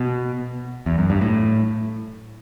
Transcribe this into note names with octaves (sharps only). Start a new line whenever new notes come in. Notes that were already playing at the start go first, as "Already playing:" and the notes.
Already playing: B2
E2
F#2
G2
A2